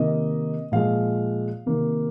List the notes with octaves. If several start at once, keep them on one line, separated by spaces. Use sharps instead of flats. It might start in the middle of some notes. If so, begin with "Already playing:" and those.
Already playing: C3 D#3 A#3 D#5
A#2 F3 G#3 F5
C3 D#3 A#3